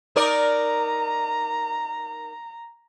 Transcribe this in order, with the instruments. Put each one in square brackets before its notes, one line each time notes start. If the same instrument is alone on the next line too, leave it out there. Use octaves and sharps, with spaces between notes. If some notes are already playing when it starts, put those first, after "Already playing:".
[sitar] D#4 A#4 D5 [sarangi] A#5